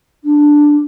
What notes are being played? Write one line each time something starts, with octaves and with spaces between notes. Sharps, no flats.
D4